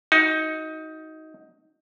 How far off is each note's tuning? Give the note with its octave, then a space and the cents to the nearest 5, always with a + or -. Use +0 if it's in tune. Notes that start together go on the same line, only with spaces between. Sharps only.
D#4 +20 F#4 +0